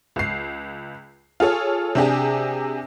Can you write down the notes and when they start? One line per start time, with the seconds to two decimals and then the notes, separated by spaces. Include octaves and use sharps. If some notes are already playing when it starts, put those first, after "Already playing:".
0.16 C#2 C7
1.40 F4 G#4 A4 C#5
1.95 C3 D4 G4 G#4